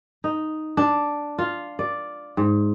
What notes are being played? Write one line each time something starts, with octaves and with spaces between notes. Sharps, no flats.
D#4
D4
F4
D5
G#2